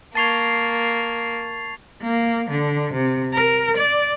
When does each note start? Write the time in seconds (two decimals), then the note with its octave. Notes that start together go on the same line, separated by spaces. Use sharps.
0.15 A#3 A5 C#6 G#6 A6 C7 F7
2.02 A#3
2.50 D3
2.94 C3
3.34 A#4
3.77 D5